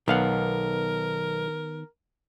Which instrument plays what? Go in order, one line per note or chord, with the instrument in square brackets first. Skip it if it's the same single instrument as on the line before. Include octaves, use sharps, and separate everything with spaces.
[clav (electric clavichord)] B1 F5 F#5 [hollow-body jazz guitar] D#3 B3 [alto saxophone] A#4